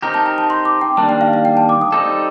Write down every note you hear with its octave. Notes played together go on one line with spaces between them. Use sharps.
C4 D#4 G4 A#4 A#5
A5
A#5
A5
C6
D6
G5
D#3 G3 A#3 D4 A5
G5
F5
F5
G5
A5
D6
D#6
G3 C4 D#4 A4 D6